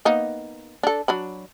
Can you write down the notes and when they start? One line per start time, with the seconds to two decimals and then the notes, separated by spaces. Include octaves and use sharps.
0.05 A#3 B3 D#4
0.83 D4 A4
1.08 F#3 D4 B5